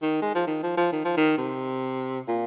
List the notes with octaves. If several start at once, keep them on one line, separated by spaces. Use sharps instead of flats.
D#3
G#3
F3
D#3
F3
F3
D#3
F3
D#3
C3
A#2